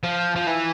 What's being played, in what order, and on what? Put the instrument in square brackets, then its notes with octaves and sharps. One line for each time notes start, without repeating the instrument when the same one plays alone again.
[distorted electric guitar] F3
F3
E3